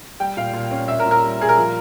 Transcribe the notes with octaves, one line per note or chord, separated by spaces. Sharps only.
G3 G5
A#2 F5
A#2
C#4
A#2 E5
A#4
A#2
A#4
G3
A#2 G#4
A#4
F3